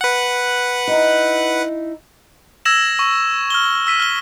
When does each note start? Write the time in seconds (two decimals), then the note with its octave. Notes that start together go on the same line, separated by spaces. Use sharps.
0.01 B4 F#5
0.87 D#4 E4
2.65 E6 G#6 A#6 E7 F#7
2.99 C#6
3.50 F6 G7
3.87 E6 B6 D#7
4.00 F6 G7